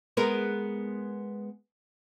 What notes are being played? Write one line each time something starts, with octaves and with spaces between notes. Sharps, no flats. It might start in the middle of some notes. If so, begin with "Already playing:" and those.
G#3 B3 A#4